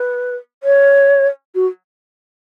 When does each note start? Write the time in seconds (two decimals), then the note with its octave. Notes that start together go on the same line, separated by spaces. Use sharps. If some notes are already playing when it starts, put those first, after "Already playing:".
Already playing: B4
0.63 C#5
1.55 F#4